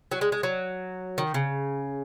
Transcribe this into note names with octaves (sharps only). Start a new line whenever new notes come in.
F#3
G#3
G#3
F#3
D#3
C#3